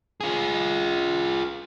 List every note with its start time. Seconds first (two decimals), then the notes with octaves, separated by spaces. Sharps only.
0.21 F4 G#4